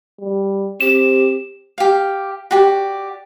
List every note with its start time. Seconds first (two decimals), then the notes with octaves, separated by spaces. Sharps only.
0.20 G3
0.81 C4 G4 E7
1.78 G4 F5
2.51 F#4 G4 D5